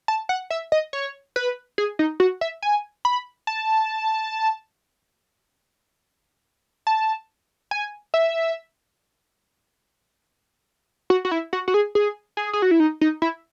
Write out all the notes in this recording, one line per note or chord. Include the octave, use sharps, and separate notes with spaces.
A5
F#5
E5
D#5
C#5
B4
G#4
D#4
F#4
E5
G#5
B5
A5
A5
G#5
E5
F#4
F#4
E4
F#4
F#4
G#4
G#4
G#4
G#4
F#4
E4
D#4
D#4
E4